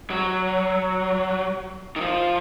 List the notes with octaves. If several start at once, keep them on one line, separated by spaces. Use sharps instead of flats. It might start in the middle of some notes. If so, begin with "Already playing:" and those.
F#3
D#3
F3